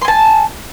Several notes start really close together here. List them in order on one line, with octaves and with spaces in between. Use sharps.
C6 G#5 A5